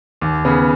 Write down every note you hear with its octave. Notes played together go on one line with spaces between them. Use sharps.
D#2
C#3 B3